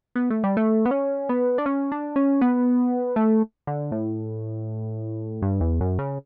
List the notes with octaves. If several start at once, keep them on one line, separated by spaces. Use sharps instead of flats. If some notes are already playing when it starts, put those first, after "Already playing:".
B3
A3
G3
A3
B3
C#4
B3
D4
C#4
D4
C#4
B3
A3
D3
A2
G2
E2
F#2
C#3